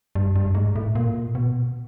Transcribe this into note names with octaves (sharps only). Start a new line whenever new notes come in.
G2
G2
G#2
A2
A#2
B2